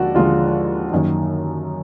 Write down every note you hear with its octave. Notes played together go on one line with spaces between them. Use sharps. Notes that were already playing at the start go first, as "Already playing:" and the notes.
Already playing: D#2 D3 F3 G#3 F#4 D5
D#2 D3 F3 G#3 F4
F#2 D#3 A#3